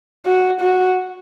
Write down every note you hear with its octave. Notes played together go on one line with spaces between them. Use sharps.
F#4
F#4